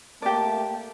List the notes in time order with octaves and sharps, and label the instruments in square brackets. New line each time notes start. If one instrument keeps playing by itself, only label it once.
[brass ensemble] A3 A#3 A5 [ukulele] G4 D5